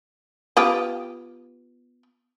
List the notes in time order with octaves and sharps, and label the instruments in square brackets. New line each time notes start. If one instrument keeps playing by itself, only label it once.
[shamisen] B3 F4 G4